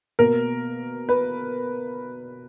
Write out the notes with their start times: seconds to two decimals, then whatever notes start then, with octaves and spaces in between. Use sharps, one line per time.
0.19 B2 A#3 A#4
1.09 B4